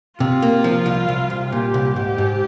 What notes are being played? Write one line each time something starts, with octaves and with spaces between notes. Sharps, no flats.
C3 F4
A#3
F3
C2
C2
C2
A#2 G4
C2
G#2 G4
G#2